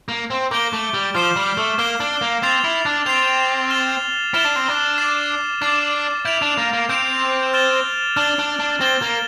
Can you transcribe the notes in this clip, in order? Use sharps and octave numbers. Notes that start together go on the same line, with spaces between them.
A#3
C4
A#3 D6 G6 D7 G7
A3
G3
F3 F6 C7 E7 G7
G3
A3
A#3 F6 C7 E7 G7
D4
A#3
C4 A6 C7 F7
E4
D4
C4 A6 C7 F7
F6 A6 E7 G7
E4 F6 A6 E7 G7
D4
C4
D4
D6 A6 C7 E7
D4 D6 A6 C7 E7
E4 G6 D7 F7
D4
A#3
A#3
C4 G6 D7 F7
F6 A6 E7 G7
D4 F6 A6 E7 G7
D4
D4
C4 A6 E7 G7
A#3